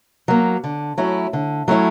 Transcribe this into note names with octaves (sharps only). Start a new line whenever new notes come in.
F#3 A#3
D3
F#3 A3 C#4 E4
D3
F#3 A3 C#4 E4